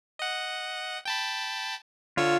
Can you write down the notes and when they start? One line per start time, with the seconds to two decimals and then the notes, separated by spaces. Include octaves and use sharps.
0.19 D#5 F#5
1.05 G5 A5 B5
2.17 D3 F4 C#5 E6